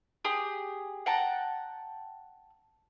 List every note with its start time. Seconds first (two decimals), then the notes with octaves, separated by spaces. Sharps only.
0.25 G4 G#4 D#6
1.06 F#5 G5 A5 A#5